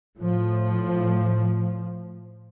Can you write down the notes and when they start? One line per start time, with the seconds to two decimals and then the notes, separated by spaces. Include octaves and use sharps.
0.19 A2 F3